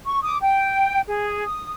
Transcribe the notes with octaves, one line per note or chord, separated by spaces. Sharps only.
C#6
D6 D#6
G5
G#4
D#6